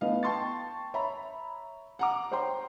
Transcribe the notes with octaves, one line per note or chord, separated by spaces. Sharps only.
A3 B3 E4 D#5 F5
G5 A5 C6 C#6 A6
C#5 E5 A#5 B5
F#5 A#5 D6
C5 C#5 G5 A#5 C6